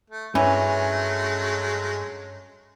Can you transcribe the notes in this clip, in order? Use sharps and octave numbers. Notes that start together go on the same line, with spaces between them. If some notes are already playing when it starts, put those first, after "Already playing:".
A3
G2 E3 F#3 G#3 A3 C#4